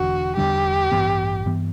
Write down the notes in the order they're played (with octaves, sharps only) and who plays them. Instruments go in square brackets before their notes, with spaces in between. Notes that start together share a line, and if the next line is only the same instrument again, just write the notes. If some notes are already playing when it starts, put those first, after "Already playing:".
Already playing: [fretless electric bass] E1 E2 D3 [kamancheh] F#4
[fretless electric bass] E2 D3 G3 D4 [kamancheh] G4
[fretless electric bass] A1 G2 E3 B3
G2 E3 B3